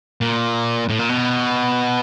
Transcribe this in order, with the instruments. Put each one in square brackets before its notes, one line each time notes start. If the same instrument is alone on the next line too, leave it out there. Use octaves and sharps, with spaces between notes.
[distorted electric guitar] A#2
A2
A#2
B2